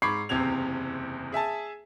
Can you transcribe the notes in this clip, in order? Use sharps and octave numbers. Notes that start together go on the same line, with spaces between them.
G#2 B5 C#6 D6 G#6 C7
F#1 E2 C3 C4 G#6 F7
G#4 E5 G#5 A5